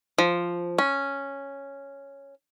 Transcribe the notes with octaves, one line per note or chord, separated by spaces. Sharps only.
F3
C#4